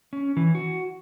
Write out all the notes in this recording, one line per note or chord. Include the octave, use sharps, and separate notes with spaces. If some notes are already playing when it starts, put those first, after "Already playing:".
C#4
E3
F#4